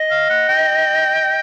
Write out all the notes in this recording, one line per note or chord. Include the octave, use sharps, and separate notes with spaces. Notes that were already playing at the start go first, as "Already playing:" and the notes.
Already playing: D#5
F5
F#5
G5